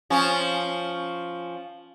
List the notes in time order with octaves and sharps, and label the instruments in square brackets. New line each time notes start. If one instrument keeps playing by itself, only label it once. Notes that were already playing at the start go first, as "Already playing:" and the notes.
[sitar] F3 C#4